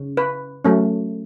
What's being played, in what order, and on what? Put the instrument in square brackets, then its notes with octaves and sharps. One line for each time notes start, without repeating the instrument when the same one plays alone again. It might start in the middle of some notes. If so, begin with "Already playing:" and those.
Already playing: [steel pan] C#3 C#4
B4
F#3 A3 C#4